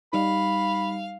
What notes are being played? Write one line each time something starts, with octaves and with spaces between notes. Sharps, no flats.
G3 D#4 F5 B5